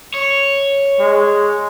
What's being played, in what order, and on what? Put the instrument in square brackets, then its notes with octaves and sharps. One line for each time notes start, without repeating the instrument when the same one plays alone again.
[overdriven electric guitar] C#5
[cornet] G#3